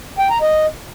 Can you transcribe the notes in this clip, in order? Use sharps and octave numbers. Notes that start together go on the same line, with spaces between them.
G5
A#5
D#5